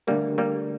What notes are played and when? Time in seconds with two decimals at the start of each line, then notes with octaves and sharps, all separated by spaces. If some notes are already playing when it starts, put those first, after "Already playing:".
0.07 D3 G3 A3 A#3 D4 G4 A#4
0.38 G3 A#3